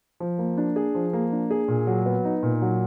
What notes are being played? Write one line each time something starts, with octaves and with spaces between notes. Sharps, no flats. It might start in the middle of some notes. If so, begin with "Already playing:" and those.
F3
A#3
D4
G#4
F3
A#3
D4
G#4
A#2
F#3
B3
D#4
A#2
F#3